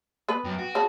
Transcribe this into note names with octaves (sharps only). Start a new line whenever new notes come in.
B3 B4
F#2 G5
F#4
C#3 A5